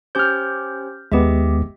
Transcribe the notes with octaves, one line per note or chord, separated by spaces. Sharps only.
C#4 G4 C5 F6 G6
D#2 G#3 B3 G4 D#5 E5